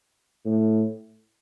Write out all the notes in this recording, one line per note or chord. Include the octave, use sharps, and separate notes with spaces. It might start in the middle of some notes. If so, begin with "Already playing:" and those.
A2